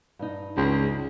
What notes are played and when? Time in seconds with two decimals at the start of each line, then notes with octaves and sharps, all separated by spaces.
0.19 G2 D#4
0.57 C#2